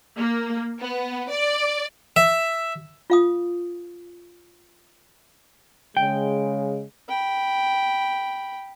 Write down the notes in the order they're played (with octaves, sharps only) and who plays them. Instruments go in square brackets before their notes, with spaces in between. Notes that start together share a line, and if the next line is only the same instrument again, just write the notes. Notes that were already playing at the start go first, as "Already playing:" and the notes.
[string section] A#3
B3
D5
[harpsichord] E5
[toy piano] F4 F5 D#6
[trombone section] C#3 G#3 [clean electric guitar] G5
[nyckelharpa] G5 B5